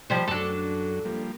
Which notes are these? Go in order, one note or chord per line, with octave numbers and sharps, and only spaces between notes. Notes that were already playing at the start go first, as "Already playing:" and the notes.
F3 G3 C5
F#2 F#3 D4 A4
F3 G3 A#3